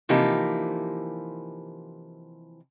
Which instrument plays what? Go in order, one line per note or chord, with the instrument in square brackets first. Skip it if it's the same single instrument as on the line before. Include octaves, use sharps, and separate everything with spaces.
[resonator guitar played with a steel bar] C3 E3 F3 A#3 D#4 G4